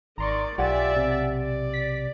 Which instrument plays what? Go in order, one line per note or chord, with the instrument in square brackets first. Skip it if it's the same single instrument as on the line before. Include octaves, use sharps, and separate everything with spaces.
[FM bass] G#1 [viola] D#3 D5 [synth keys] A#5 C6 C#6
[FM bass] B1 [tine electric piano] F4 G4 [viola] D5 E5 [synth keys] F#5 G#5 A6
[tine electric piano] C3
[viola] D5
[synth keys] B6